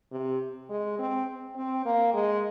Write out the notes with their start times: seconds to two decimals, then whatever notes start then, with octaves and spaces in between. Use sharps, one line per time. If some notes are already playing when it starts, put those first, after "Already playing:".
0.12 C3
0.70 G#3
0.99 C4
1.56 C4
1.85 A#3
2.14 G#3